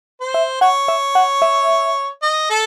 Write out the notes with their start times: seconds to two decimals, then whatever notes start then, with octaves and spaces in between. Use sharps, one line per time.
0.21 C5
0.34 E5
0.61 C#5 F#5
0.88 E5
1.15 F#5
1.42 E5
2.22 D#5
2.50 A4